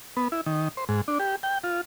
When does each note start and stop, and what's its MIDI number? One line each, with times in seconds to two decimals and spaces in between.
0.17 0.28 59
0.32 0.41 64
0.46 0.68 51
0.77 0.85 72
0.89 1.01 44
1.08 1.18 62
1.19 1.36 67
1.43 1.58 79
1.64 1.81 65